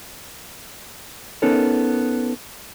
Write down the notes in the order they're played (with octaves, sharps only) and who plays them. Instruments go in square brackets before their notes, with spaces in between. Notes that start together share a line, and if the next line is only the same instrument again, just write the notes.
[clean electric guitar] B3 C#4 D#4 A4 A#4 C#5